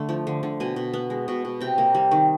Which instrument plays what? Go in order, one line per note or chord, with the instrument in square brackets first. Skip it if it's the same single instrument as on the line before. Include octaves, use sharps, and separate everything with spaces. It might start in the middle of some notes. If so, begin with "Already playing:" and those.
Already playing: [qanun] D3 A3
F3
D3
D3
B2 G#5
B2
B3
G#3
B2
B2
C3 G5
A#3
G3
D#3